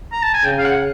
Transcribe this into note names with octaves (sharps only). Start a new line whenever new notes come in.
A#5
A5
G#5
C#3 G5
F5
F#5